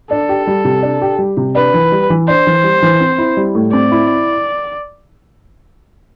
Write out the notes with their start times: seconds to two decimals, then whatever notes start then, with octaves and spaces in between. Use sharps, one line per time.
0.11 D4 A4
0.29 G4
0.47 G3
0.65 C3
0.83 D4
1.02 G4
1.19 G3
1.37 C3
1.55 D4 B4
1.74 E3
1.92 G3
2.10 E3
2.28 D4 C5
2.47 E3
2.64 G3
2.82 E3
3.00 C4
3.18 E4
3.37 G3
3.55 A2
3.73 C4 D5
3.92 E4